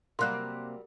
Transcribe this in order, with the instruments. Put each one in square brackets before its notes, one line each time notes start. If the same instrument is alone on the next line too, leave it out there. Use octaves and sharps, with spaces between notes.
[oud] C3 A#3 C4 [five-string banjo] F#3 G3 A#4 [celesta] C6 F#6